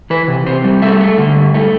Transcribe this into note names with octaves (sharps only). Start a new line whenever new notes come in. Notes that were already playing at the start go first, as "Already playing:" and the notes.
E3 B4
C3
C3 C5
G3
A3 E5
A3
D3
G2
A3